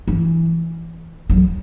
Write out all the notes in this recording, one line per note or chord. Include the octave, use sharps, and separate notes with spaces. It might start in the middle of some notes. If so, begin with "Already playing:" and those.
E3
F#3